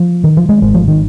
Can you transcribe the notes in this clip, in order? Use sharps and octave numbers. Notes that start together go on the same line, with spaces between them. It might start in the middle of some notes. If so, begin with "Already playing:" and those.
Already playing: F3
D#3
F3
G#3
G#1 G#2 G#3
F3
D#3